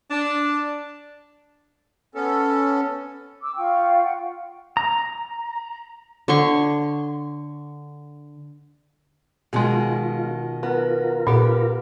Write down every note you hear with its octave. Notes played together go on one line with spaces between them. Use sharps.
D4
B3 C#4 A4
D6 E6
F4 F5 G5 C#6
F#5 G5
A#5
D3 C#5 C6 C#6
B2 D#3 G#3 F4 G#4
B3 F4 A#4
A#2 B3 G4